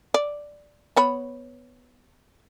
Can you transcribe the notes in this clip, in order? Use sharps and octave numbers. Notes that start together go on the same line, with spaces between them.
D5
B3 C#5 B5